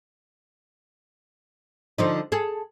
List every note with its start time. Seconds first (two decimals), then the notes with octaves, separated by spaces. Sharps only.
1.98 D3 F3 D#4
2.32 G#4 A4